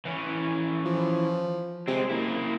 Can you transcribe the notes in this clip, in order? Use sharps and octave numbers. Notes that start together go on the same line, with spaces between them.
E3 C#4
F3
C3 G#3 C4
F#1 A#3 E4